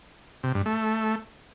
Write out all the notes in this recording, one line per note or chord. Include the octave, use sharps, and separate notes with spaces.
C3
G2
A3